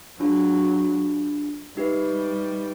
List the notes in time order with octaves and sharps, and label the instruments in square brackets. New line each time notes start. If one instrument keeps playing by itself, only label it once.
[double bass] F#3 [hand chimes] D4 F4 G#4
[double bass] G3 [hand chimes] D#4 G4 B4 E5